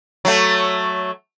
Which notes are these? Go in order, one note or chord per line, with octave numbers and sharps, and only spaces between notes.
F#3 A3